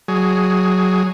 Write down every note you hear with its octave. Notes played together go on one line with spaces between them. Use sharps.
F#3 G#4